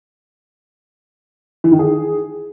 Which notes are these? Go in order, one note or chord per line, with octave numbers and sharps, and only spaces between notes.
E3
D#3
G#4